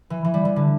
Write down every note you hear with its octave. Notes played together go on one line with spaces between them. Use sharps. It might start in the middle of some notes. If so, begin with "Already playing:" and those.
E3
E3
G3
E3
D3